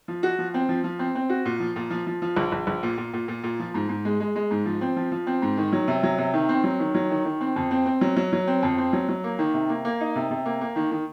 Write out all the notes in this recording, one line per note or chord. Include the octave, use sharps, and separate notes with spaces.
F3
F#4
F3
C4
F3
F3
C4
C4
F#4
A#2
F3
A#2
F3
F3
F3
A#1
A#1
A#1
A#2
A#2
A#2
A#2
A#2
F3
G#2
G#2
G#3
G#3
G#3
G#2
F3
C4
F3
F3
C4
G#2
D#3
F#3
C3
F#3
C3
D#3
C4
F#3
D#3
F#3
D#3
D#3
C4
F2
C4
C4
F#3
F#3
F#3
C4
F2
C4
F#3
F#3
A#3
D#3
C3
A#3
A#3
D#4
C3
C3
A#3
A#3
D#3
D#3